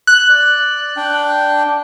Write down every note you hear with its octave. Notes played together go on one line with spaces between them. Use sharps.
F#6
D5
D4 G5